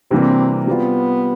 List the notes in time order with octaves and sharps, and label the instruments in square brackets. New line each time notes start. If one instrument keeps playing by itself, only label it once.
[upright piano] C3 E3 G3 A#3 D4 [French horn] C4
[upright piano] G3 C4 F4 [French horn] B3